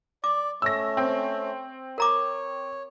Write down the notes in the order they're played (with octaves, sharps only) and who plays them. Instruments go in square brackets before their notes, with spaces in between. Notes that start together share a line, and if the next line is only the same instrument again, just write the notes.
[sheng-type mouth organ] D5 [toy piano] D6
[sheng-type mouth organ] A3 C#4 [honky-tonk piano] E6 A#6
[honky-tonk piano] C4
[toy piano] A#4 A#5 D6 [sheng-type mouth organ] C#5